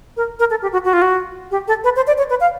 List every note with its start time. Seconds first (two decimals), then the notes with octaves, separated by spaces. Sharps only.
0.17 A#4
0.39 A#4
0.50 A4
0.62 G4
0.73 F#4
0.85 F#4
0.93 F4
1.02 F#4
1.51 G4
1.68 A4
1.84 B4
1.96 C5
2.07 D5
2.18 C#5
2.30 B4
2.40 F5